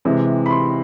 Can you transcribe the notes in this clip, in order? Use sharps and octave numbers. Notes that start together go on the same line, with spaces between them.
C3 E3 G#3
B5
C6